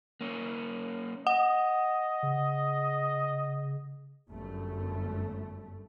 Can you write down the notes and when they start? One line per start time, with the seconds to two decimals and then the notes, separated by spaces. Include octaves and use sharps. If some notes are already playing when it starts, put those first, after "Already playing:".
0.21 A#3 C#4
1.27 D#5 F#5
2.23 C#3
4.30 G1 F#2 A3